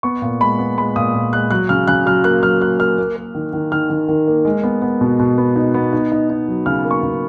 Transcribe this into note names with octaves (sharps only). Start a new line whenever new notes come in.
B3 C#6
A#2
G#3 B5
B3
G#3 B5
A#2 D#6
A#2
G#3 F#6
F#3 F#6
C#3 F6
C#3 F#6
F#3 F6
A#3 F#6
F#3 F6
A#3 F#6
A#3 F6
A#3
A#3
D#3
D#3
D#3 F6
D#3
D#3
A#3
G#3
B3
B3
B2
B2
B3
D#4
B3
D#4
D#4
D#4
F#3
C#3 F6
A#3
C#6
C#3